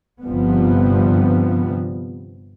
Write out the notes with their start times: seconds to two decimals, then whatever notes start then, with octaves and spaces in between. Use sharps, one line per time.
0.23 G1 G2 C3 F3 G3 B3